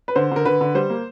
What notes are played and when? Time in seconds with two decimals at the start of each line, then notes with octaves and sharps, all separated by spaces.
0.08 B4
0.16 D3 C5
0.31 D3 A#4
0.45 D3 B4
0.61 D3
0.75 G3 C5
0.90 A#3